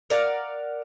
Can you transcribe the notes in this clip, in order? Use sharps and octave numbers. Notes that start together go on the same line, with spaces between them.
A#4 D5 F5 F#5